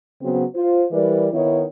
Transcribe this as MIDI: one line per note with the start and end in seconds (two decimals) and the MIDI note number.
0.21 0.43 49
0.21 0.43 54
0.21 0.43 59
0.21 0.43 60
0.55 0.83 65
0.55 0.83 72
0.91 1.28 52
0.91 1.28 55
0.91 1.28 70
0.91 1.28 71
0.91 1.28 74
1.32 1.63 51
1.32 1.63 59
1.32 1.63 63
1.32 1.63 64
1.32 1.63 73